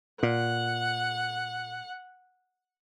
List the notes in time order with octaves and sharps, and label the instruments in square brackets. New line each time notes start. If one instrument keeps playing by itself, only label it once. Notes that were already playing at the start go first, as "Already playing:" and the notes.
[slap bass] A#2 [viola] F#5